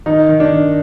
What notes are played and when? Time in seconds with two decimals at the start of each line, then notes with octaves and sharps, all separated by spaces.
0.06 D#3 D#4
0.29 D#3
0.40 D4
0.52 D#3